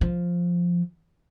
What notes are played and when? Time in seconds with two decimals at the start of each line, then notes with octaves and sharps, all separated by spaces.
0.01 F3